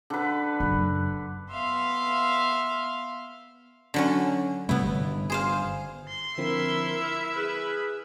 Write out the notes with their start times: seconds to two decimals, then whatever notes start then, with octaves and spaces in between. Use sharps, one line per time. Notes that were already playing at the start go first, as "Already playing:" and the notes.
0.10 D3 B4
0.60 F#2 C#3
1.50 B3 E5 F5 C6
3.94 D3 F#3 C#4
4.69 C3 G3 A3 B3 E4
4.83 G1
5.30 G#4 C5 F5
6.08 C6
6.38 D3 F3 C4 E4 A#4 E5
7.04 F6
7.35 G#4 B4